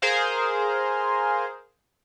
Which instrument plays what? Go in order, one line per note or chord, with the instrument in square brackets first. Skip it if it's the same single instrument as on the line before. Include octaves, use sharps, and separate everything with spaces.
[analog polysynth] G#4 A#4 C5 F5